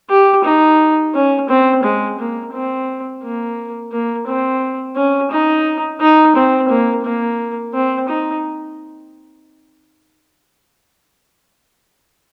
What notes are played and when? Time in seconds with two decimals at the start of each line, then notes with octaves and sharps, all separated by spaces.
0.09 G4
0.44 D#4
1.14 C#4
1.49 C4
1.83 G#3
2.19 A#3
2.53 C4
3.23 A#3
3.92 A#3
4.27 C4
4.96 C#4
5.31 D#4
6.00 D#4
6.35 C4
6.69 A#3
7.04 A#3
7.73 C4
8.08 D#4